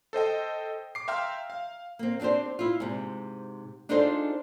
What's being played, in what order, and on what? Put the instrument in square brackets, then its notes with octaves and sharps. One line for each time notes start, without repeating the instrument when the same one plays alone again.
[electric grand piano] A4 C5 D#5 G5
D6 C7
E5 F5 G5 A#5 C6 F6
F5
[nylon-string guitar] A#3 C4
C4 D4 F#4 G4 C5
E4 F4
G#2 C3
D4 D#4 F4 G#4 A4 C5